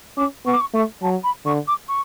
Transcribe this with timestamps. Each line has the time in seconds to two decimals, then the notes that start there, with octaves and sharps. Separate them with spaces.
0.17 C#4 D6
0.46 B3 C#6
0.53 D6
0.60 C#6
0.74 A3 C#6
1.02 F#3 A5
1.23 B5
1.45 D3 C#6
1.67 D6
1.88 C#6